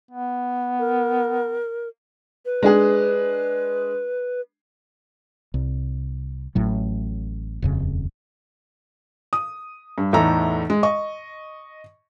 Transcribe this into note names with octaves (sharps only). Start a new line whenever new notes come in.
B3
A#4
B4
G#3 D4 G#4
C2
A1 A2 F#3
D#1 F2 C#3
D#6
G2
E2 A2 D#4 A4 A#5
G#3
D#5 C#6